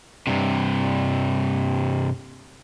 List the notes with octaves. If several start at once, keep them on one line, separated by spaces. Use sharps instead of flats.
G2 C3